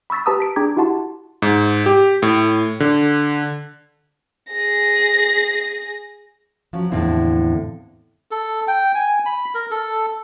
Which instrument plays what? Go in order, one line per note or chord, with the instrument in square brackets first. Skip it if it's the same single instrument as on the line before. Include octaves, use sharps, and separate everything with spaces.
[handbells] B5 C#6 E6 A6 B6
G4 B4 A5 A#5 D#6 E6
B6 D7
D4 G#4 G5 A#5 D6 G#6
E4 F#4 G4 F#5 A5 C6
[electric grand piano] G#2
G4
A2
D3
[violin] G#4 A#6
[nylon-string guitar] F3 F#3 C#4
E2 A2 D3 F3 C4 E4
[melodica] A4
G5
G#5
B5
A#4
A4